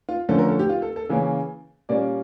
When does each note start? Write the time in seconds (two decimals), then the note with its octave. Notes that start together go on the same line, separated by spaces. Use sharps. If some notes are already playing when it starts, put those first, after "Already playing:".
0.09 F4
0.29 D3 F3 A3 C#4 A4
0.38 A#4
0.49 A4
0.59 G4
0.69 F4
0.82 A4
0.96 A4
1.09 C#3 E3 A#3 C#4
1.89 A#2 G3 A#3 C#4 D5